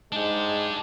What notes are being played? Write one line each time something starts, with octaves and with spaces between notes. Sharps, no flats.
G#2 G#3 D4 G4